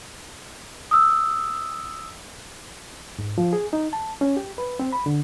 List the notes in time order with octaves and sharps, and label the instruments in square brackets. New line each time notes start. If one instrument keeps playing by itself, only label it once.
[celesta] D#6 E6
[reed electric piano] G#2
F3
G#4
D#4
A5
C#4
G4
B4
C4
B5
D3